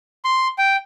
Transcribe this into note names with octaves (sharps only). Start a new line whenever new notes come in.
C6
G5